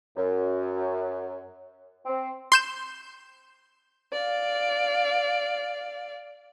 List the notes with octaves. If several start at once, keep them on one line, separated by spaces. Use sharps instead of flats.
F#2
C4
C6 G6 E7
D5 F5